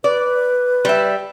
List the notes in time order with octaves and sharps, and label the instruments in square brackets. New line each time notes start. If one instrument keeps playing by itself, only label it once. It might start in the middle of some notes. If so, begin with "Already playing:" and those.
[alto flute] B4 [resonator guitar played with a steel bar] D5
[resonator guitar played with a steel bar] G3 E5